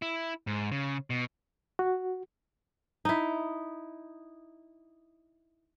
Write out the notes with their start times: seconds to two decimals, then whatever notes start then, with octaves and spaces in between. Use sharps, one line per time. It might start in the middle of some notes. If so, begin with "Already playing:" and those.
0.02 E4
0.47 G#2
0.72 C#3
1.10 B2
1.79 F#4
3.05 D#4 E4